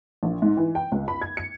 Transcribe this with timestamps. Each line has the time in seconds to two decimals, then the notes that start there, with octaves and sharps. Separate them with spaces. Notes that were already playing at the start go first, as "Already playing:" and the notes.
0.23 A#1
0.42 G#2
0.57 E3
0.75 G5
0.92 C#2
1.08 B5
1.22 G#6
1.37 C#7